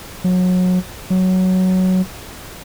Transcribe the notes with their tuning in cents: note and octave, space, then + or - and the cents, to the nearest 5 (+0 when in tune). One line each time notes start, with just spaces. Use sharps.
F#3 -25
F#3 +5